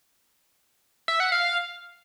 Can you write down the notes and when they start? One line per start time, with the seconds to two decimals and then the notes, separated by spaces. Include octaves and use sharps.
1.08 E5
1.20 F#5
1.32 F5